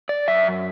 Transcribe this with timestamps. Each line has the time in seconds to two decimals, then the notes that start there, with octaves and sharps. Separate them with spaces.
0.09 D5
0.28 F#2 E5